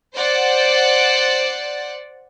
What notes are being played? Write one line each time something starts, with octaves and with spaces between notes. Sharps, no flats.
C5 D5 F#5